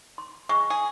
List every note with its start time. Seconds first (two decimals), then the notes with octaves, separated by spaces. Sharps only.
0.18 C6
0.49 G#3 C#6
0.70 G#4